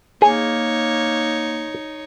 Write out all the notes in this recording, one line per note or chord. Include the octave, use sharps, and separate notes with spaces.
A#3 D#4 G#4 C#5